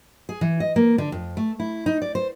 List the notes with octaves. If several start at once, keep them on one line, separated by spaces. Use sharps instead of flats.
G#4
E3
D#5
A#3
D3
F2
A3
E4
D#4
D5
C5